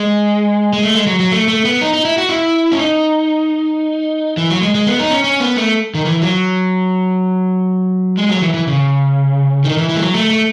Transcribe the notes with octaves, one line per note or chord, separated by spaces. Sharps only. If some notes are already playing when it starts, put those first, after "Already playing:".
Already playing: G#3
G#3
A3
G#3
F#3
F#3
A3
A3
B3
D#4
D#4
E4
F#4
E4
C#4
D#4
E3
F#3
G#3
G#3
B3
D#4
C#4
C#4
B3
A3
D#3
E3
F#3
G#3
F#3
E3
E3
C#3
D#3
E3
E3
G#3
F#3
A3
A3